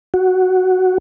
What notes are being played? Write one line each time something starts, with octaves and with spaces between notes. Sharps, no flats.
F#4